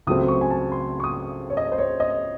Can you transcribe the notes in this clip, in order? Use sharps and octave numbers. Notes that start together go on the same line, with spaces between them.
C#2 C#3 F#3 A3 C4 D#6
C#6
G#5
A5
C6
C#6
D#6
C#5
D#5
C5
C#5
D#5